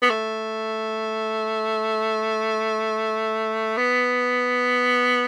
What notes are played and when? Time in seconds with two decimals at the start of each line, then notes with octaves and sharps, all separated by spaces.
0.02 B3
0.10 A3
3.77 B3